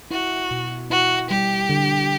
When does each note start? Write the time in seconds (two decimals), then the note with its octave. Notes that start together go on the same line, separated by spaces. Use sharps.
0.11 E4 F#4
0.51 B2
0.90 E4 F#4
1.30 G3 G4
1.69 D3